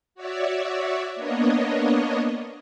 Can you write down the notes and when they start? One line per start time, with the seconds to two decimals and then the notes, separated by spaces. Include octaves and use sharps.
0.15 F#4 C#5 D5 E5
1.16 A#3 B3 D4 C#5 D#5